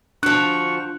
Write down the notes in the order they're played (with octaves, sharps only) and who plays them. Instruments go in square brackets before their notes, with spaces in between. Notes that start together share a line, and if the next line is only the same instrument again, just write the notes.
[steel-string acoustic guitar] D2 F3 [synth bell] D4 [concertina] C#6 [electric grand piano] F#6